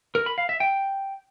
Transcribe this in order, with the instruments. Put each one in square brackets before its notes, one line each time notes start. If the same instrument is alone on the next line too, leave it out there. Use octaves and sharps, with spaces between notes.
[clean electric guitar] A#4
B5
F5
E5
G5